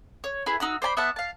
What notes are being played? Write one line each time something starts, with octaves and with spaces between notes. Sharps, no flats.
C#5
E4 G#4 B4
D#4 F#4 E6
C5 D5 A5 B5
B3 E5 F#5 A5
F5 A5